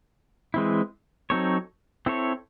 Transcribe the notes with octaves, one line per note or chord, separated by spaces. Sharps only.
E3 G#3 C4 E4
F#3 C4 D#4 A4 C#5
C4 E4 A4 C#5